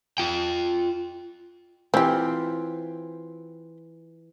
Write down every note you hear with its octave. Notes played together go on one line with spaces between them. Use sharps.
F4 G5
E3 C4 F4 G4 C5